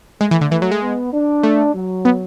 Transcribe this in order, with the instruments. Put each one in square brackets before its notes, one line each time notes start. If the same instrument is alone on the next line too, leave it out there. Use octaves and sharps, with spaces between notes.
[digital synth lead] G#3 [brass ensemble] A3
[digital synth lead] E3
D3
E3
F#3
G#3
[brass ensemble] B3
D4
[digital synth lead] A3
[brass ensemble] F#3
[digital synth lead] B3